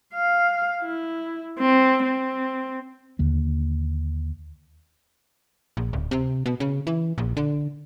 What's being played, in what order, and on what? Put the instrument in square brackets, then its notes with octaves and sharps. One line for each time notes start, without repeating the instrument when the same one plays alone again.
[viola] F5
E4
C4
C4
[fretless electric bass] D#2 D3 A#3
[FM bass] A#1
D1
C3
B2
C#3
E3
A#1
D3